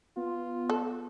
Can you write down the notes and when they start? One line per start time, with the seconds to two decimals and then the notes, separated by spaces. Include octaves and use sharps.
0.17 B3 F4
0.70 A4